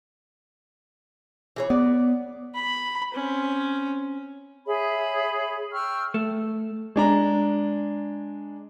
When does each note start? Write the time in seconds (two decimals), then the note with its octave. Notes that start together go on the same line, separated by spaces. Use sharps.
1.56 E3 G#4 C#5
1.70 B3 D5
2.55 B5
3.14 C4 C#4
4.66 G#4 C#5 E5 B5
5.72 G5 C#6 E6 F6
6.14 A3
6.96 G#3 D4 A#5